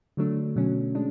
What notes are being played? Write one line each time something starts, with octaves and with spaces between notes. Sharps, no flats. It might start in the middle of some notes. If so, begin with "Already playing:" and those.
D3 F#3 A3 D4
B2 F#3 C#4
G#3 D4